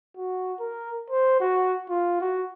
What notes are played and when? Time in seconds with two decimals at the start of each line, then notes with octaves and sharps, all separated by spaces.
0.17 F#4
0.60 A#4
1.10 C5
1.40 F#4
1.89 F4
2.21 F#4